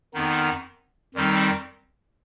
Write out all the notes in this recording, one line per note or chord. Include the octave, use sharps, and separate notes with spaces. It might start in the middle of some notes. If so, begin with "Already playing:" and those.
F2 D#3 B3 D#4
F2 D#3 G3 C4 D#4